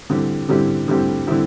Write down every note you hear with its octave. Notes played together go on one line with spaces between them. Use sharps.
D3 G3 C4 E4 G4
D3 G3 C4 E4 G4
D3 G3 C4 E4 G4
D3 G3 C4 E4 G4